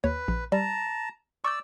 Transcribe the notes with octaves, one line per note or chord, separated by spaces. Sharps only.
D#2 B4 C#5
A#1
G3 A5 A#5
D5 C#6 D6 E6 G6